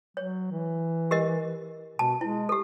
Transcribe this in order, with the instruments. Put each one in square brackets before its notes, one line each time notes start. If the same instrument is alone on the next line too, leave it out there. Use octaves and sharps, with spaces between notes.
[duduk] F#3 [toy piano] C#5
[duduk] E3
[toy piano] G4 A#4 D#5
[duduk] B2 [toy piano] A5
[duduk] G#3 [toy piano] E4
[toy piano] G4 A4